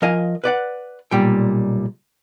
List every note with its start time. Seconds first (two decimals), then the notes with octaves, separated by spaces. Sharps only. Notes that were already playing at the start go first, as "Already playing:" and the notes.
0.02 F3 A#4 D#5 F5 G#5
0.44 B4 D5 F#5
1.11 B1 A#2 G3 G5